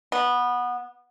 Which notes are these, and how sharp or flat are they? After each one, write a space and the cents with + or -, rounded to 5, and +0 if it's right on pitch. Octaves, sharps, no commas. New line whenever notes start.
B3 -15